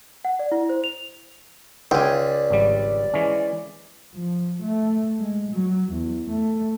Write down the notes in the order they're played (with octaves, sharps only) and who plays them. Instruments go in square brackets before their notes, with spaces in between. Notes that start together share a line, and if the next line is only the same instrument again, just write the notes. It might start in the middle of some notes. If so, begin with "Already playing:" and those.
[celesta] F#5
D5
E4
C5
F7
[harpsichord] C#2 [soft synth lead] D5 [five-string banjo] G5 G#5
[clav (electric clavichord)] G#1 G3
E3 G#3 C#4
[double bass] F3
A3
G#3
F#3
E2
A3